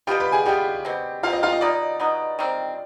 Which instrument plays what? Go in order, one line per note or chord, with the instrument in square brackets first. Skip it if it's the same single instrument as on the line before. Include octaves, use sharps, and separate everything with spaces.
[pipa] B2 G3 B3 F4 [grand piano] G4 G5
[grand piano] B4 B5
G#4 G#5
[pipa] B2 G3 B3 F4 [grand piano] G4 G5
[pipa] B2 G3 C4
[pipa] B2 G3 C4 [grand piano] F4 F5
[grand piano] D#5
F4 F5
D#5
[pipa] B2 B3 D#4 [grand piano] D5
[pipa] B2 B3 D#4
D#3 G3 C4